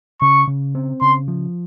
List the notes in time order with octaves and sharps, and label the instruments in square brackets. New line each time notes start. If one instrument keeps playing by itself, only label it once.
[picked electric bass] C#3 [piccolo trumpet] C#6
[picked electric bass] C#3
C4
[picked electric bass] C#3 [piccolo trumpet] C6
[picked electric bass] F3